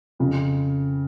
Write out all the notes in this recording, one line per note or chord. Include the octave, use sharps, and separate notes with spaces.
F2 C#3 F3